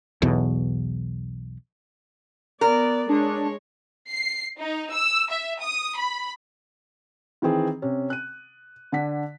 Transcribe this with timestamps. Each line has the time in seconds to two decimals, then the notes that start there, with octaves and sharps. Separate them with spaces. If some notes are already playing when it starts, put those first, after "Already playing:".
0.22 B1 E2 B2
2.61 B3 A#4 D5
3.09 G#3 D4 C#5
4.09 C7
4.58 D#4
4.92 E6
5.30 E5
5.60 D#6
5.97 B5
7.42 D#3 E3 C4 G#4
7.82 C3 C#4
8.10 F#6 D#7
8.92 D3 D4 F#5 B6